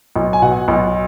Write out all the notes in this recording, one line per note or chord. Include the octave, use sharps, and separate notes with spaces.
B1
G#5
B2 F#5
B1